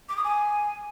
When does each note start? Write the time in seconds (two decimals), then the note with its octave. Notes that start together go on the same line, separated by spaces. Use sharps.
0.09 D6
0.17 D#6
0.24 G#5